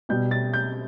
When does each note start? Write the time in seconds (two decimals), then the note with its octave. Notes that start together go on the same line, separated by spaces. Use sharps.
0.09 B2 G3 G6
0.31 A6
0.54 G6